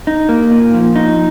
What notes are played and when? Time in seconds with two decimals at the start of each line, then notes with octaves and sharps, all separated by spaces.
0.07 D#4
0.29 A#3
0.52 A#2
0.74 F3
0.95 D#4